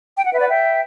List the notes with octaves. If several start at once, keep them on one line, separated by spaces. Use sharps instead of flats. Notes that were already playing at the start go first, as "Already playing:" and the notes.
G5
F#5
B4 E5
D5 F#5
E5 G5